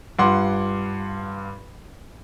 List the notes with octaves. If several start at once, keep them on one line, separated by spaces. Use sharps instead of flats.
G2 F4 F#5 C6 D6